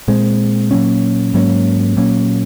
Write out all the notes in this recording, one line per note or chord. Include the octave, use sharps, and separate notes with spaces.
A#2 G#3 C4
A#2 F#3 A#3 C#4
G#2 F#3 A#3 C#4
A#2 F#3 A#3 C#4